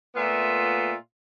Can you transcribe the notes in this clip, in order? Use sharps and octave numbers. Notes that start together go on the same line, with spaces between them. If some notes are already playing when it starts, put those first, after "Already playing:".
A#2 A3 B3 F4 E5